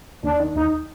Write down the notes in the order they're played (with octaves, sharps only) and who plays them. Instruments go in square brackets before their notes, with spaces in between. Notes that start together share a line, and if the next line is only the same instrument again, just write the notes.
[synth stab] D#2 [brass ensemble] D4
[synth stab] D#3
[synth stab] D#2 [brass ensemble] D#4